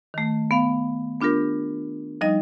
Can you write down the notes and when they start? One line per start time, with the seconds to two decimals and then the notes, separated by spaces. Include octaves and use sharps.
0.14 D#3 A3
0.51 B3 F5
1.21 B3 D4 F4 G4 A#4
2.21 F3 G3 D#4 D#5